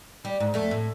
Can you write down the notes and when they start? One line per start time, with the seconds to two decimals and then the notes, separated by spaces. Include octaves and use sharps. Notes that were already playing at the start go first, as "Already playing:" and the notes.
0.25 G3
0.40 G#2
0.54 F2 A3
0.71 A2